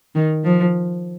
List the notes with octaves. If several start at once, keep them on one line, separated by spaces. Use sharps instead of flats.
D#3
F3